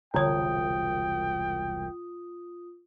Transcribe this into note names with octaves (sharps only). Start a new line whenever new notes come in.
E1 C2 D3 F4 C#5 G5 D#6